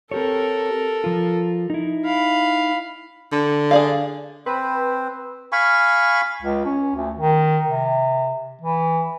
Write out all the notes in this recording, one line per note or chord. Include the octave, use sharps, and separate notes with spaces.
C4 G4 A4 A#4 C#5
F3 F4
D#4 E4
F5 B5
D3
G#4 D5 F5
C4 B4 C5
F5 G#5 B5 C#6
C#2
C#4
D2
D#3
C3
E3